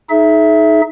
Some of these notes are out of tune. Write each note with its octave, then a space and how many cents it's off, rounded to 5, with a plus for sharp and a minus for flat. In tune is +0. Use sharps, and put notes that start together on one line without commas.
D#4 +10 G#4 +35 E5 +0